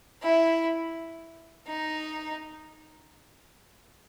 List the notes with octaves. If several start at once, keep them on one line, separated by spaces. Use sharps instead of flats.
E4
D#4